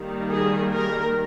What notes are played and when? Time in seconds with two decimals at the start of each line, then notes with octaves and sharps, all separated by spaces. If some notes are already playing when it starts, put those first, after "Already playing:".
Already playing: D#3 G3 A#3
0.30 G#4
0.73 A#4